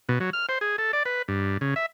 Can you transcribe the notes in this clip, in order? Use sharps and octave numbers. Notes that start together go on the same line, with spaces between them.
B2
F#3
F6
C5
G#4
A4
D5
B4
G2
C#3
E5